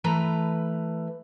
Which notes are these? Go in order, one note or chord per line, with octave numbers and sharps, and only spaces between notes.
E3 A3 B4 A#5